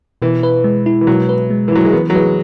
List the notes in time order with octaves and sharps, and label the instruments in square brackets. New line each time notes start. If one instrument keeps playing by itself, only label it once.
[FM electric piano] B2 [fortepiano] E3
[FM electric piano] B4
G#3
E4
[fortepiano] E3
[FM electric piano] B2 [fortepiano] F#3
[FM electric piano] B4
G#3
[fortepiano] E3
[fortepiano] F#3 [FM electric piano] E4
[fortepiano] G#3
[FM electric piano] E3 [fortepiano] B3
[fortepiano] F#3
[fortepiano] G#3 [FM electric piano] B4